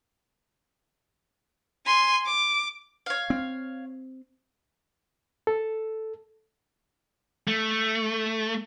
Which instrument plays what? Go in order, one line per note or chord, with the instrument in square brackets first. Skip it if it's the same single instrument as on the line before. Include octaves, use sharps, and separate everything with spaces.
[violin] G#5 C6
D6
[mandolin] C#5 F5
[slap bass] C4
[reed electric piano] A4
[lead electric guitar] A3